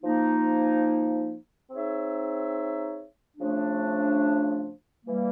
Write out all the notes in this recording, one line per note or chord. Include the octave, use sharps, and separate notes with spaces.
F3 A#3 D#4
C4 D#4 G#4 C#5 E5
C#3 F3 A3 D4
E3 G3 A#3